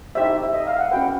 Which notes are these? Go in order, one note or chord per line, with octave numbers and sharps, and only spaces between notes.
D#4 G4 C5 E5
E5
D#5
F5
F#5
C#4 F#4 B4 G5